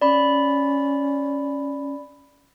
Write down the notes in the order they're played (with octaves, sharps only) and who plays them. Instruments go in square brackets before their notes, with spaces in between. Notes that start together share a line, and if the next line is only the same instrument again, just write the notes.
[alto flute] C#4 [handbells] D5 B5